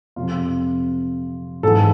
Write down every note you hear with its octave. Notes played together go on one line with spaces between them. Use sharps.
F2 C3 F3 F4
G#2 E3 A4